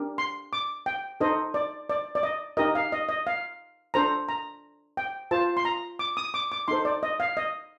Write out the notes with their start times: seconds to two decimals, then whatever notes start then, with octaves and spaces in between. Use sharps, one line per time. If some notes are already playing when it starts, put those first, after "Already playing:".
Already playing: D4 G4 A#4
0.18 C6
0.53 D6
0.86 G5
1.21 D#4 A4 C5 D#5
1.54 D5
1.90 D5
2.15 D5
2.23 D#5
2.57 D#4 G4 A#4 D#5
2.75 F5
2.92 D#5
3.09 D#5
3.27 F5
3.94 D4 A4 C5 A#5
4.29 A#5
4.97 G5
5.31 F4 C5 A5
5.57 C6
5.65 A#5
5.99 D6
6.17 D#6
6.34 D6
6.52 D6
6.68 D#4 A4 C5 C6
6.85 D5
7.03 D#5
7.20 F5
7.37 D#5